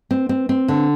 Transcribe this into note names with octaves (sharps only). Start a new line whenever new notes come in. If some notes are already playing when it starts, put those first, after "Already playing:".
C4
C4
C4
D3